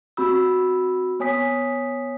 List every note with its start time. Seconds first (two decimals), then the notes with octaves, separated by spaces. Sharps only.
0.17 C4 F#4 B5 E6
1.20 B3 C#5 G#5 D#6 B6